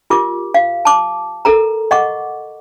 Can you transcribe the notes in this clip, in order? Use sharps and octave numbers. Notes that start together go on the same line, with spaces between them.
F4 G4 A#4 D6
F5
A5 D6
A4 A#4 A#5
D#5 F#5 C#6 D6